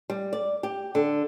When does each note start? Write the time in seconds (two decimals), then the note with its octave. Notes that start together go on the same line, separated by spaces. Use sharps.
0.10 G3
0.33 D5
0.63 G4
0.95 D3